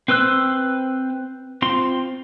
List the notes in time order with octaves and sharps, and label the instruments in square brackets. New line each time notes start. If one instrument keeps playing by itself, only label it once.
[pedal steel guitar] C4 B4 C5 E6 F#6
C4 F4 C6